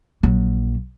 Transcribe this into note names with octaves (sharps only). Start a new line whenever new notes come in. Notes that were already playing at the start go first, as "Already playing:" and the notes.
A#1 F#3